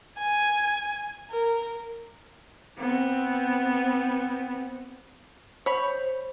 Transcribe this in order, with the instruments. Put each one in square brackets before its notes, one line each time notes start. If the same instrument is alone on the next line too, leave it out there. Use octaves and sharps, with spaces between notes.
[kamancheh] G#5
A#4
[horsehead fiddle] B3 C4
[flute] C5 [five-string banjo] C#5 B5